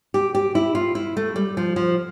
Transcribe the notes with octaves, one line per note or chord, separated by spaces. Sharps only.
G4
G4
E4
F4
E4
A3
G3
F3
F3